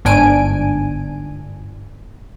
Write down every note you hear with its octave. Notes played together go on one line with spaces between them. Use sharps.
G1 G#2 D4 G#5 D7